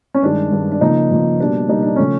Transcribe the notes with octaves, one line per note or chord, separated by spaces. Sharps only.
C#4
G2 D#3 G#3 D4
G2 D#3 G#3
D4
C#3 F3 A#3 D#4
C#3 F3 A#3
B2 G3 A#3 D4
B2 G3 A#3 D#4
D4
C#3 F3 A3 C#4